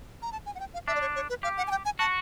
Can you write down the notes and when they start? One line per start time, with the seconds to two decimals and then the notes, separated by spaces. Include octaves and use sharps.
0.22 A#5
0.32 A5
0.46 G#5
0.55 F#5
0.60 G5
0.74 F5
0.87 D4 E5
0.95 D5
1.01 C#5
1.15 C#5
1.29 B4
1.43 G4 F5
1.57 F#5
1.67 G#5
1.71 G5
1.85 G#5
1.99 F#4 A5